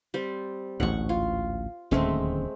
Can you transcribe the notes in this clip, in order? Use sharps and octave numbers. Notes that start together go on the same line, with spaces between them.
G3 C4
A1 D2 G#2 F#5 C#6
F4
D1 D#2 G#3 A3 C4 C#4